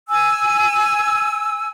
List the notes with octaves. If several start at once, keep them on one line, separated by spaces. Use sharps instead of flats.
G#5 E6